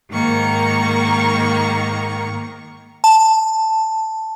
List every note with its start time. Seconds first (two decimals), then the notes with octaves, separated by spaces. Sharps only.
0.11 G#2 D#3 A#3 A#5 C#6
3.04 A5